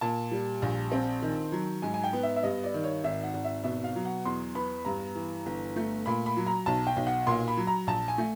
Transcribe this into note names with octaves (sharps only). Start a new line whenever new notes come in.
A#2 A5
G3
A#1
C4
D#3
F#3
G#2 G#5
G#5
G5
B3
E5
E5
G2 D#5
D5
D#3
C#5
G#1 E5
F#5
G#1
E5
B2 E5
F5
F#3
F#5
E2 C6
B3 B5
G2 A#5
E3
G1
A3
A#2 B5
B5
F#3
A#5
B1 A5
G5
B1
F#5
A#2 C6
B5
F#3
A#5
A#1 A5
G#5
A3